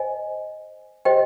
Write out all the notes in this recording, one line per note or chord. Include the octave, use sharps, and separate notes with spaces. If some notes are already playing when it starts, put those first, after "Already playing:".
Already playing: C5 D#5 G#5
G4 C5 D#5 G5